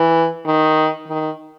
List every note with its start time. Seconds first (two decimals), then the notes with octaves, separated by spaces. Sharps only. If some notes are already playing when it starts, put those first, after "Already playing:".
Already playing: E3
0.46 D#3
1.08 D#3